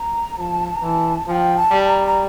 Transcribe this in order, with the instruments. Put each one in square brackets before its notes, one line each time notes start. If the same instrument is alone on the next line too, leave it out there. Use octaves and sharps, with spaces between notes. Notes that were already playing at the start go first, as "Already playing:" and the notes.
Already playing: [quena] A#5
[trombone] F3 [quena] A5 A#5
[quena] A#5
[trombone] E3 [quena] A5
[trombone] F3 [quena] G5 A5
[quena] A5
[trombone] G3
[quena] A#5
A#5